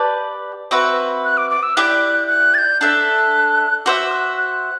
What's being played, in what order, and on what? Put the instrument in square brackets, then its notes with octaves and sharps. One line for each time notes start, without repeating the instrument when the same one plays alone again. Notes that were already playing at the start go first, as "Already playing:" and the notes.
Already playing: [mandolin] G4 B4 D5 A5
C4 F#4 B4 E5
[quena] F#6
D6
D6
E6
[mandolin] E4 G4 D5 G5 [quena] F#6
[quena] F#6
A6
G6
[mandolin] D4 A4 E5 [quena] F#6
[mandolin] F#4 C5 E5 [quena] D6
[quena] F#6
F#6